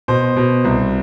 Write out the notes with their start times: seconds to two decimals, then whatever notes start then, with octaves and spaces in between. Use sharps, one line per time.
0.08 B2 C5
0.36 B2
0.64 C2